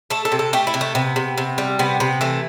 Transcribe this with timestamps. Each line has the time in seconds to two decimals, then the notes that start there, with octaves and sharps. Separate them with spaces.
0.10 A3 A4
0.25 A4
0.32 C3
0.39 A4
0.53 A3 G4
0.67 E4
0.74 C3
0.81 A3
0.95 C3 B3
1.16 C3
1.37 C3
1.58 G3
1.79 C3 B3
2.00 C3 B3
2.21 E3 A3